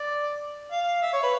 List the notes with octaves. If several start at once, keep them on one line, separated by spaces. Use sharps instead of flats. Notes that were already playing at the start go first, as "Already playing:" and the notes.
Already playing: D5
F5
E5
C#5
B4